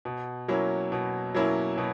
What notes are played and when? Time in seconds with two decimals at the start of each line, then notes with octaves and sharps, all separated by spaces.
0.05 B2
0.48 F#3 A#3 C#4 E4
0.92 B2
1.34 F#3 A#3 C#4 E4
1.78 B2